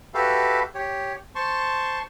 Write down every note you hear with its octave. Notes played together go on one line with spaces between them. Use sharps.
F#4 G4 A4 B4 E5 F5
G4 C#5
C5 A5 C6 C#6